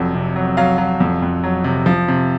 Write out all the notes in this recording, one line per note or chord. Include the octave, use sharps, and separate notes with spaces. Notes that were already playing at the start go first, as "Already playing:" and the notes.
Already playing: F1 F2 F#3
C3
F#3
F#3 F5
F#3
F2
F2
F#3
C3
F3
C3